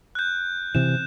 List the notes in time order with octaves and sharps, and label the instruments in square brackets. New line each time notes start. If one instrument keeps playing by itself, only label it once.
[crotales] F#6 G6
[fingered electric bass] C3 E3 [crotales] E7